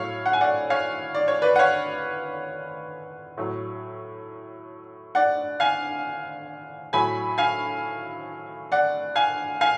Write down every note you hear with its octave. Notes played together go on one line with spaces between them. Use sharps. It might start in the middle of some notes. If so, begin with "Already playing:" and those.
Already playing: A2 F#3 C#5 F5
F#5
G#5
D5 F#5
C#5 F5
D5
C#5
B4 D5
F#5
C#5 F5
A2 F#3
D5 F#5
F5 G#5
A2 F#3 G#5 B5
F5 G#5
D5 F#5
F5 G#5
F5 G#5